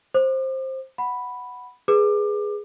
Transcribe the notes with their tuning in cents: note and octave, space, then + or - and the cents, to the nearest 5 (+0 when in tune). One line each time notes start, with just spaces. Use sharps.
C5 +15 D6 +40
F#5 +0 B5 +0
G#4 +0 B4 -5 D6 +25